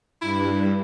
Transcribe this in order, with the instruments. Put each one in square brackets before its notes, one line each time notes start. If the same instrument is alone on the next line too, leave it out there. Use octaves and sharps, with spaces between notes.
[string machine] G2 [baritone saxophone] E4